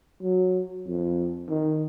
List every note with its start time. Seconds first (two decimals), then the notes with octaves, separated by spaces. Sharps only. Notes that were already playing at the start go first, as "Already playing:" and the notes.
0.22 F#3
0.87 F2
1.49 D#3